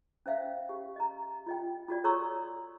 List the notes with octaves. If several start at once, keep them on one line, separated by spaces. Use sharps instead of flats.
C#4 C5 E5 F5
G4
D#5 A#5
F4 D#5 G5
F4 F#4 D5
A4 C#5 A#5 C6 C#6 E6